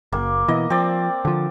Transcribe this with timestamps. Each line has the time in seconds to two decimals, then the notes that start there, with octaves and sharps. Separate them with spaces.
0.13 F#1 A#3
0.48 B2 E3 D#5
0.70 F3 C4 D5
1.25 D3 F3